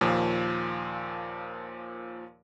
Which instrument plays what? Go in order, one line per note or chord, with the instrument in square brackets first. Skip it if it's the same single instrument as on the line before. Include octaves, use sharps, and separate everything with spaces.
[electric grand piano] D#2 A#2 F3